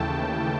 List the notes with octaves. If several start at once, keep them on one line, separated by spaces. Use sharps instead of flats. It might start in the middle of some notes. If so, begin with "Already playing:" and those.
Already playing: D#2 C#3 E3 A3 G5 A5